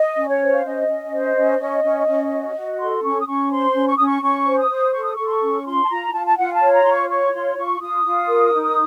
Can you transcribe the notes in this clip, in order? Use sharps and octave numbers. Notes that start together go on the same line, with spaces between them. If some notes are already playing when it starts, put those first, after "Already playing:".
Already playing: D#5
C#4
C#5
C5
F5
C#4 D#5
C#4
C5
C#4
C#4
C#4
C#4
F#4
F#4
A4 C6
C#4 C#6
D#6
C#4 C#6
C5 C6
C#4
C#6
C#4 D#6
C#6
C#4 C#6
C5
D#6
C5
A4 C#6
D#6
A4 C#6
C6
C#6
C#4
F4 C6
A5
F4 A#5
F4 A5
A5
F4 F#5
A5
C#5
A#5
F4 C6
C#6
C#5 C#6
F4 C6
F4 C#6
F4 D#6
F4
A#4
D#4